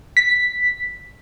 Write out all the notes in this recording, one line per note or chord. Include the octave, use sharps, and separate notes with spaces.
B6